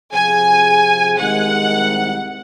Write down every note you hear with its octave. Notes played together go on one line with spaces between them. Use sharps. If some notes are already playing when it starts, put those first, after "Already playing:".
C3 F3 C4 F4 G#4 G#5
C2 C3 D#3 G#3 F#5